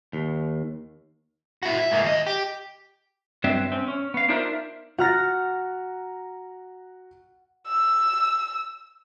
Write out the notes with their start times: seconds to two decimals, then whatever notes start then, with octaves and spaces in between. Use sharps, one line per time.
0.13 D#2
1.63 E4 F#4
1.78 E5
1.91 G#2 A#3
2.03 D#2 D#5
2.27 G4
3.44 G2 F#3 C4 E5
3.72 C4 C#4
3.88 C#4
4.14 B3 F5
4.29 D4 D#4 F4 A#4 C5 E5
4.98 F#4 F#5 A#5 F6 A6 A#6
7.68 E6